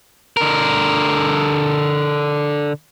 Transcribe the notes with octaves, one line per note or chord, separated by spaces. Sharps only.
D3 A#4